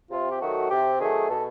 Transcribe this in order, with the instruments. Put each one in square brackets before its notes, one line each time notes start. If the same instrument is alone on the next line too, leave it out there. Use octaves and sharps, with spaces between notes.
[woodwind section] C3 [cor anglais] F4
[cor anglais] G4
[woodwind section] D#3 F#3 A3 [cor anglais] F#4
[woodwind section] C3 [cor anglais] G4
[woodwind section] D#3 F#3 A3 [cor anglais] G#4
[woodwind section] B2 [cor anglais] A4